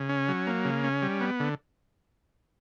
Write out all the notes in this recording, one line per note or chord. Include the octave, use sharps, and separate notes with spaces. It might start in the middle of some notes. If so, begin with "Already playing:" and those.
Already playing: C#3
C#4
F#3
A#3
C#3
C#4
G3
B3
D3